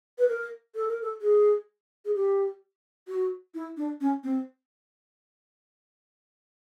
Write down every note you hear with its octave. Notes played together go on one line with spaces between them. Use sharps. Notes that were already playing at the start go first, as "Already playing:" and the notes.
B4
A#4
A4
A#4
A4
G#4
G#4
G4
F#4
E4
D4
C#4
C4